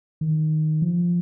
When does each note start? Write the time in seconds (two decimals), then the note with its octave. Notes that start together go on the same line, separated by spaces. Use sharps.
0.21 D#3
0.82 F3